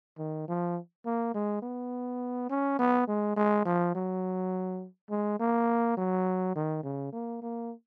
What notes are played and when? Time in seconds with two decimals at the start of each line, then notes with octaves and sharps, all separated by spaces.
0.18 D#3
0.48 F3
1.06 A#3
1.34 G#3
1.63 B3
2.50 C#4
2.79 B3
3.08 G#3
3.37 G#3
3.65 F3
3.95 F#3
5.10 G#3
5.40 A#3
5.97 F#3
6.56 D#3
6.83 C#3
7.13 A#3
7.42 A#3